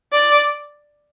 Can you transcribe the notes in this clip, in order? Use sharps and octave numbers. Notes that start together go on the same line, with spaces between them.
D5